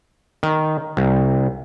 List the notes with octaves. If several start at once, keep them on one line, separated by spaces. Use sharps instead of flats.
D#3
C2